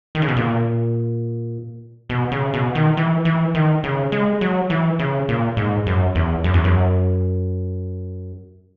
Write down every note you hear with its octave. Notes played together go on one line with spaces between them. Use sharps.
D#3
C#3
B2
A#2
B2
C#3
B2
D#3
E3
E3
D#3
C#3
G#3
F#3
E3
C#3
A#2
G#2
F#2
E2
F#2
E2
F#2